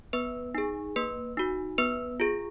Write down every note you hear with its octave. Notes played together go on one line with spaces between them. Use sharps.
B3 B4
D#4 G#4
A#3 B4
D#4 F#4
B3 B4
F4 G#4